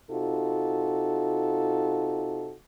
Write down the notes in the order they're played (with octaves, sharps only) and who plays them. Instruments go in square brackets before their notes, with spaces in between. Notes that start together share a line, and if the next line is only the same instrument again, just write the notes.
[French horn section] C3 D#4 F4 F#4 A4